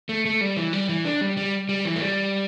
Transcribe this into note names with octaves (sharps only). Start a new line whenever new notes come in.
A3
A3
G3
E3
G3
E3
D4
G3
G3
G3
E3
A3
G3